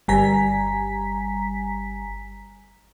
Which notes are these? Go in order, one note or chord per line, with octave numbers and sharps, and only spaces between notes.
G1 G3 G#5 A#5 B6